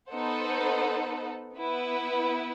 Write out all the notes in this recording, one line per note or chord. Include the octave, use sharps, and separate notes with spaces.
B3 D#4 A4 C5 F#5
B3 E4 B4